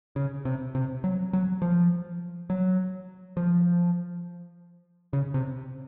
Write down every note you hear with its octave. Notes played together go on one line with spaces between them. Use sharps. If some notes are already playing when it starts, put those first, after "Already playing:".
C#3
C3
C3
F#3
F#3
F3
F#3
F3
C#3
C3